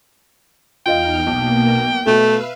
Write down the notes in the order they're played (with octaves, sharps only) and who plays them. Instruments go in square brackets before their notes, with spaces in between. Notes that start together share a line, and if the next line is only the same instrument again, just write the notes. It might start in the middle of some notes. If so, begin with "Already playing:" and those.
[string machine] E2 D#4 F6 [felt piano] F4 D#5 F5 [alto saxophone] G5
[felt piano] B1 [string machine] B2 A#3
[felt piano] B2 F#4 [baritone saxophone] A3 [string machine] B4 E5 F5